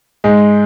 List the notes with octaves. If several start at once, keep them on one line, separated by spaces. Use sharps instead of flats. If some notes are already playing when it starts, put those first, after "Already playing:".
G#2 G#3